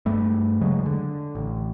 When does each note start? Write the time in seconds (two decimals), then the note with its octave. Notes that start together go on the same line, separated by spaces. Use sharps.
0.06 G2 G3 A3
0.61 E2 C#3 F#3 G#3
0.86 D3
1.35 A1